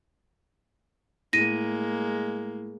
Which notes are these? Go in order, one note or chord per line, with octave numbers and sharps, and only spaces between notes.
A2 G#3 A#3 A#6 D#7